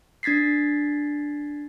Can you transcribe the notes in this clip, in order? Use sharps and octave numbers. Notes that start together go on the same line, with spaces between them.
D4 G#6 A6 B6 C7